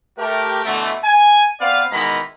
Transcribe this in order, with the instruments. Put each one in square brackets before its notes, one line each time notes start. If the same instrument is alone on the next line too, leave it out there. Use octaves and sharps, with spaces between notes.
[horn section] A3 G4 A#4
B2 D3 E3 A3
G#5
B3 C4 B4 D5 F5
B2 D#3 E3 G#3 A#5 B5